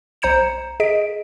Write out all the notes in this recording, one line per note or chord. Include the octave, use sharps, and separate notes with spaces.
B1 C5 A#5 G6 C#7 E7
G#4 D#5 B6 D7